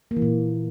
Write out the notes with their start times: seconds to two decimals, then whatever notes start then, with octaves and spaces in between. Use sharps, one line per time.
0.11 A#3
0.17 E3
0.22 A#2